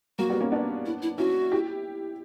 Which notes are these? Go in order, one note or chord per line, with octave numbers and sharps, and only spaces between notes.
F#3 A#3 F#4
G3 B3
A#3 C#4
B3 D4
E4
E4
C#4 E4 F#4
E4 G4